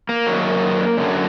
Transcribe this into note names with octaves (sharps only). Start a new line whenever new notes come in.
A#3
F#2 D#3 F#3
F#2 D3 F#3